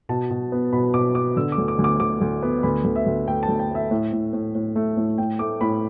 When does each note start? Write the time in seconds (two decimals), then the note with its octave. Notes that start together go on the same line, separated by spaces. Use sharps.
0.09 B2 A5
0.30 B2
0.52 B3
0.73 B2 B5
0.94 B2 D6
1.15 B3 D6
1.37 D3 E6
1.52 D6
1.58 D2
1.68 D6
1.79 D2
1.84 D6
2.00 D2 D6
2.21 D2
2.43 B3
2.63 D2 B5
2.84 D2
2.96 E5
3.06 D2
3.27 A3 G5
3.43 A5
3.48 D2
3.59 G5
3.70 A3
3.75 E5
3.91 A2
4.12 A2
4.33 A2
4.55 A2
4.76 A3
4.97 A2
5.18 A2 G5
5.39 A3 D6
5.61 A2 B5